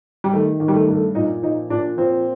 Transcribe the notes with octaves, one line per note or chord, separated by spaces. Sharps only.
G3
D#3 A3
D#3
G3
A3
G2
A3
A#2 D#4
F3 D#4
A#2 D4
F3 C4